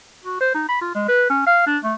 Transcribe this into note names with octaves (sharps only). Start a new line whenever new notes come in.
F#4
C5
D#4
B5
F4
G#3
B4
C#4
F5
D4
A3